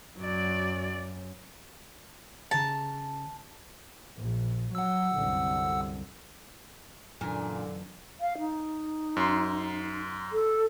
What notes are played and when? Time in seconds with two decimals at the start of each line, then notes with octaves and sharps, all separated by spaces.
0.18 F#2 F#3 D5
2.51 C#3 A5 A#5
4.18 A#1
4.75 F#3 F#5 E6
5.16 C2 F#2 D3
7.21 F#2 A#2 D3 E3 D4 G#5
8.20 F5
8.38 D#4
9.17 F#2 C6
10.32 A4